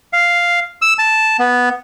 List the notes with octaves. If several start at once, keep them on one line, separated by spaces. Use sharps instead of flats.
F5
E6
A5
B3